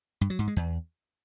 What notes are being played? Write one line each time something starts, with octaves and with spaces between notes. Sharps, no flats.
G2
F#3
G#2
G#3
E2